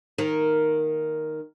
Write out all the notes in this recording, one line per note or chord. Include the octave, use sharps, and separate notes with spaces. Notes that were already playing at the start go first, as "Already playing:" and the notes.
D#3 A#3